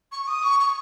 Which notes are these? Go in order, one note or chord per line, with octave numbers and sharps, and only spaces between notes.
C#6
D#6
C#6
C#6